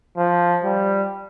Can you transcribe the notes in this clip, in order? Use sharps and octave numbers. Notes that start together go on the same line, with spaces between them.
F3
G3